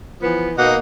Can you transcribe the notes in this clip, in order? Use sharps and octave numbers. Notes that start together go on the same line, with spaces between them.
E3 F3 B3
B2 A#3 D#4 F#5